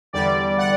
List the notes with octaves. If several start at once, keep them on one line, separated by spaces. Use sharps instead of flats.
E2 D3 G3 D5
F#5